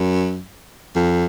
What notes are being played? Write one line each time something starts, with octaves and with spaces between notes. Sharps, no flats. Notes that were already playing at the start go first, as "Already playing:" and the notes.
Already playing: F#2
F2